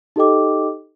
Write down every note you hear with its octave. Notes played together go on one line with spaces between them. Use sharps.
D#4 G4 A4 D#5 G5 D6